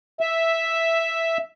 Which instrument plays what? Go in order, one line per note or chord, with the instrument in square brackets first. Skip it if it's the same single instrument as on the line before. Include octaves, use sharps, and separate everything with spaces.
[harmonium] E5